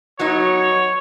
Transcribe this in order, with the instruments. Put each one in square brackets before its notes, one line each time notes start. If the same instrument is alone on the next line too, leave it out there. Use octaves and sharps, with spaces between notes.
[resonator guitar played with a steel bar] F#3 B3 D#4 [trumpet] C#5